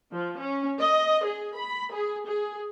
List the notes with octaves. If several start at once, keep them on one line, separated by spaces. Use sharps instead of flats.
F3
C#4
D#5
G#4
B5
G#4
G#4